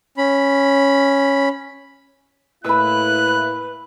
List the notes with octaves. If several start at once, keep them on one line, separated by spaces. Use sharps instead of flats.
C#4 B5
A2 A#3 E4 B4 B5 E6 F#6